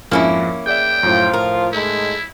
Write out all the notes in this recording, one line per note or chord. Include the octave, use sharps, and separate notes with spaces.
F2 G#2 F3 A#3 C#4 E4
G#4 D5 E5 G5
F#2 A2 F3 F4
A2 A#4
G#3 A3 D#4 E4